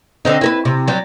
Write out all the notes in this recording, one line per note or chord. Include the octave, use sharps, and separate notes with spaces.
D3 C4 D#4
E4 A#4 B4
C3
F#3 G3